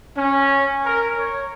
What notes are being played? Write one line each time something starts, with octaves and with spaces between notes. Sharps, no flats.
C#4
A#4
C#5